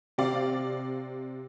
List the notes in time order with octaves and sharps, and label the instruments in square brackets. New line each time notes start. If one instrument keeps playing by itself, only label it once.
[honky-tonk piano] C3 D5 F5